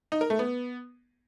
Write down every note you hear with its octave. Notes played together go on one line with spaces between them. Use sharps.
D#4
A#4
A3
B3